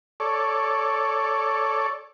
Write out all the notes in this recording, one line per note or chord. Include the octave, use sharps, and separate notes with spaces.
A4 C#5 D5